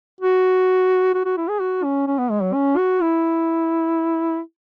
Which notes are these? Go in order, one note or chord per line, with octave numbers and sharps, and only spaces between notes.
F#4
F#4
F#4
E4
G#4
F#4
C#4
C#4
B3
G#3
F#3
C#4
F#4
E4